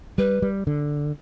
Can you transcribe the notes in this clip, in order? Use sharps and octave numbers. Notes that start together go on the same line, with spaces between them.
G3 B4
G3
D3